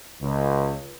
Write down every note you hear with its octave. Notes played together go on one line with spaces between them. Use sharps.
C#2